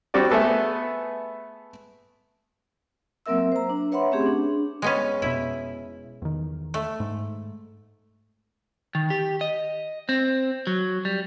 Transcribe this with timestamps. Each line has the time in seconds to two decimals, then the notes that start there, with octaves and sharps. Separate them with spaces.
0.14 G3 C4 F#4 G4 D5
0.31 A3 B3 G#4 A4 B4
3.26 F#3 A#3 C4 A#4 E5 E6
3.52 C5 A#5
3.70 D4
3.92 B4 C#5 E5 F#5 B5 C6
4.12 A3 C4 C#4 G4 G#4
4.26 D4
4.82 G#3 B3 C#4
5.22 F1 B2 E4
6.22 E2 D#3
6.74 A3
7.00 G#2
8.95 D#3
9.10 G4
9.41 D#5
10.09 C4
10.67 F#3
11.05 G3